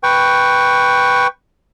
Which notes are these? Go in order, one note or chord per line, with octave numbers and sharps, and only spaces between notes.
B4 G5 C#6